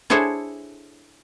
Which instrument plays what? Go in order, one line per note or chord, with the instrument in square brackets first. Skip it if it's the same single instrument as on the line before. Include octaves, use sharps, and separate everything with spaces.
[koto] D4 E4 G#4 A4 C5 C#5